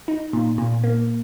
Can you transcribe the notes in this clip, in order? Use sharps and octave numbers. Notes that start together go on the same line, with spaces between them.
D#4
A#2
A#2
A#3